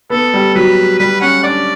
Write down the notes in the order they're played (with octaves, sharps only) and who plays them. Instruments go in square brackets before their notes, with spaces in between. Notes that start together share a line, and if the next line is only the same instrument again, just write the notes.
[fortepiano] B3 [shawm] A4
[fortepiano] G3
[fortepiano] F#3 [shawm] B4
[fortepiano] G3 [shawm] B4
[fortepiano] C#4 [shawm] F#5
[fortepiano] D4 [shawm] D5